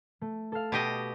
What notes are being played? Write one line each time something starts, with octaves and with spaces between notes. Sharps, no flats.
A3
A4 F5
B2 G4 D#5